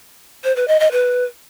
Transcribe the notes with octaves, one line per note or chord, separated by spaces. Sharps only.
C5
B4
D#5
D#5
B4